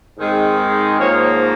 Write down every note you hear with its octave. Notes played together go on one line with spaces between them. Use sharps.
G#2 D#3 G#3 C4
G#2 F3 A#3 D#4 C#5